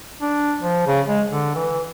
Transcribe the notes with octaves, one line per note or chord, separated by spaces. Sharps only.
D4
F3
C#3
G#3
D3
E3